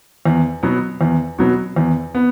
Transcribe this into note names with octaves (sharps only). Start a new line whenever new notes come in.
E2
B2 F#3 B3
E2
B2 F#3 B3
E2
B3